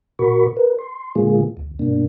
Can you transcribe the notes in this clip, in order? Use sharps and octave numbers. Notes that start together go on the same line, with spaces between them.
A#2 F#4 A#4 B5 C#6
A#4 B4
C6
A#2 D3 G#3 A#3 F4 G#4
D2
G2 B2 A#3 D4